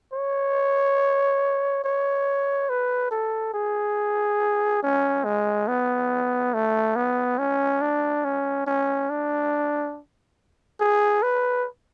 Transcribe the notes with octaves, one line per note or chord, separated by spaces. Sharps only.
C#5
C#5
B4
A4
G#4
C#4
G#3
B3
A3
B3
C#4
D4
C#4
C#4
D4
G#4
B4